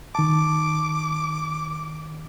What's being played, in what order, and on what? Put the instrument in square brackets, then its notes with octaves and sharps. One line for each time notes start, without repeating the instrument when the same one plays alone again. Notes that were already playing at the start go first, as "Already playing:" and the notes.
[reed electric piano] D#3 A5 [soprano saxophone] D6